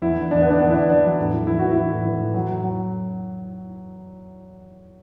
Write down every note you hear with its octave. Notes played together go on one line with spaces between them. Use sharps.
E2 E4
D3
E2 D4
B3
D3
D4
E2 B3
E4
D3 D4
E2 D4
F#3
A2
E3
E3 E4
E3 F#4
E3 E4
A2
E3
A2
F#3
F#3
F#3